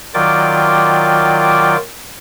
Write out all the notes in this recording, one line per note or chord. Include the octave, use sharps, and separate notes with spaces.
D#3 F#3 F4 D5 G5 D6